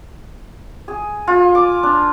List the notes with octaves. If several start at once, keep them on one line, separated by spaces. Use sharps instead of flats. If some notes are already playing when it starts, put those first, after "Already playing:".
G#4
F4
D6
D4